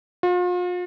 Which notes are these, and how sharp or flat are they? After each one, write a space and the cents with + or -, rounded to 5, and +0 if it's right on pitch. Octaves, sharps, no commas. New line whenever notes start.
F4 +40